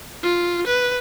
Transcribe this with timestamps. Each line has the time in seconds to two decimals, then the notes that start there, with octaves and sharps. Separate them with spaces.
0.23 F4
0.67 B4